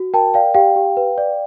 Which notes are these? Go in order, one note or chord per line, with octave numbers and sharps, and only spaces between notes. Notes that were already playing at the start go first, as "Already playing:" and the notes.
Already playing: F#4
A#4 G5 A5
D5 F5 G5
G4 F5 G5
G4
B4
D5